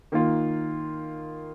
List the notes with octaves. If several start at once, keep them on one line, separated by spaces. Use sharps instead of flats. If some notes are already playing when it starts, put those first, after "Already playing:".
D#3 A#3 F4